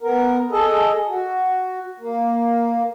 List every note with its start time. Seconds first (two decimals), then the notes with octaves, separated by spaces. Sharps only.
0.02 B3 A#4
0.51 G#4 A4 D#5
1.09 F#4
2.00 A#3